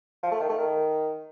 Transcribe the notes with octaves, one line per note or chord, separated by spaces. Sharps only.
F3
A3
D#3
A3
D#3